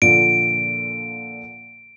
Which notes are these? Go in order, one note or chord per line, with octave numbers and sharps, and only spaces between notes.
A#2 D3 F3 D7